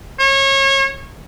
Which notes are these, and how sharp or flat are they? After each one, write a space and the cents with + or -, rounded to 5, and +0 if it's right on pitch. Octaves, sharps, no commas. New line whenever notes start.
C#5 -30